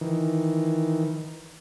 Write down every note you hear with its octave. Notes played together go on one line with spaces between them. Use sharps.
D#3 E3